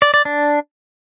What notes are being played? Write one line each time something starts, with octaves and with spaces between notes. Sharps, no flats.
D5
D5
D4